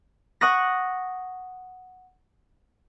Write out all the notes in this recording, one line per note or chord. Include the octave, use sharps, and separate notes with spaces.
F#5 C#6 D#6 F#6 A#6